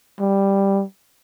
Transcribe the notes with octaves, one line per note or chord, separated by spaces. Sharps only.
G3